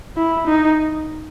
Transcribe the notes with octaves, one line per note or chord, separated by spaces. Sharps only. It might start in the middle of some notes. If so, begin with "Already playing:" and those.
E4
D#4